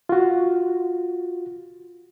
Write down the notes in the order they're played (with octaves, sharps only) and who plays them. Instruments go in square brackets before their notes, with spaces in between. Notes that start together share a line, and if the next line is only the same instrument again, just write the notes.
[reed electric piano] F4 F#4